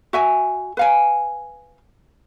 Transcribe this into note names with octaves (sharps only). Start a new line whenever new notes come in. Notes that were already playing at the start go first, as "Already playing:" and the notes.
F#4 E5 G#5
B4 F5 G#5